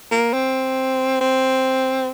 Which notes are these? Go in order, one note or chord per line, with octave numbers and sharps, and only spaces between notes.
A#3
C4
C4